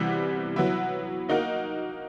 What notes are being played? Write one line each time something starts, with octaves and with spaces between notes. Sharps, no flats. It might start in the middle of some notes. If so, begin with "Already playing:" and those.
Already playing: C3 E3 G3 B3 E4
F#3 B3 E4
A#3 D#4 F#4 A#4